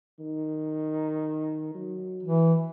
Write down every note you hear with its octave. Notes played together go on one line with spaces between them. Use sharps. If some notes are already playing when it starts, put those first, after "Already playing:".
D#3
F#3
E3